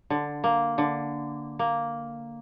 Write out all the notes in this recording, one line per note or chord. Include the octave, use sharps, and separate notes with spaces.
D3
A#3
D3
A#3